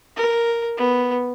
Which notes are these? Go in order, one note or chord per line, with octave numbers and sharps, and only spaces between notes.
A#4
B3